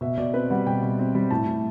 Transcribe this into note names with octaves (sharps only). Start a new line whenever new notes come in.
B2 E5
B2 D5
C4 B4
G3 F#5
B2 G5
B2
C4
G3
A2 A5
A2